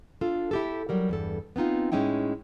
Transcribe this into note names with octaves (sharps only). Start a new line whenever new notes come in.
D4 F4 A4
E4 G4 A4
F#3 G3 A#4
E2 G2 A4
B3 C4 D#4 F4
A2 G#3 C#4 D#4 E4 G5